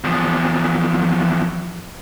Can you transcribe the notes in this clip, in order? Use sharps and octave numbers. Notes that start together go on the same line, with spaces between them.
E2 F3